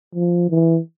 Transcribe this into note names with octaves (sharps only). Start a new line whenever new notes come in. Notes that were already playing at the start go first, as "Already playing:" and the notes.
F3
E3